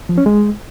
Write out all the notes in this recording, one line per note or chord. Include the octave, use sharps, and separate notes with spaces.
F3
C#4
G#3